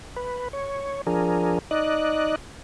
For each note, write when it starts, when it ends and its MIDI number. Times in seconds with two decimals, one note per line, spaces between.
0.16 0.48 71
0.53 1.01 73
1.07 1.59 53
1.07 1.59 62
1.07 1.59 68
1.07 1.59 70
1.71 2.36 63
1.71 2.36 74
1.71 2.36 75
1.71 2.36 90